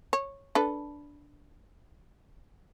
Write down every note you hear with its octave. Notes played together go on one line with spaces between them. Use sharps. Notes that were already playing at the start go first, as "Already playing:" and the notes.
C#5
D4 A4 B4